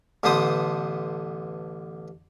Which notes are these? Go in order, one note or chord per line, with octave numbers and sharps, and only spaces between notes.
A1 D3 B3 C5 D#6